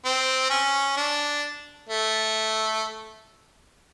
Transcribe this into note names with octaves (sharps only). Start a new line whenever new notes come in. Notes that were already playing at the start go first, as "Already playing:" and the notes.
C4
C#4
D4
A3